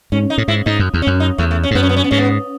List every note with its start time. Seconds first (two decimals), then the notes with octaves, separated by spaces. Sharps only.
0.12 G#2 C#4
0.30 D#4
0.38 A2
0.48 G#2 E4
0.66 G#2 D#4
0.79 F#2
0.94 E2
1.02 C#4
1.07 F#2
1.20 D#4
1.38 E2 A3
1.51 A3
1.63 C#4
1.71 G#2
1.75 F#2 B3
1.83 C#4
1.89 B3
1.96 C#4
2.04 B3
2.11 G#2 C#4
2.18 B3